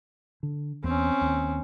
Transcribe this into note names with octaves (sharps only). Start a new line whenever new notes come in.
D3
E2 C4 C#4
D#2